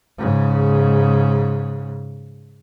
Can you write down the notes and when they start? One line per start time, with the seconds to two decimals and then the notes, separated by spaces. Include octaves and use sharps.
0.18 G#2 C#3